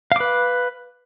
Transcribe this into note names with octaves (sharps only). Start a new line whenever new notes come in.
B4 F5 D6